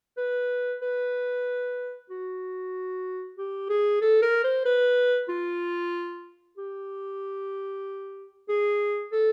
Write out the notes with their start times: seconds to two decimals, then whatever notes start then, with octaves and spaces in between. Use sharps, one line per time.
0.17 B4
0.82 B4
2.10 F#4
3.37 G4
3.69 G#4
4.01 A4
4.22 A#4
4.44 C5
4.65 B4
5.29 F4
6.57 G4
8.49 G#4
9.12 A4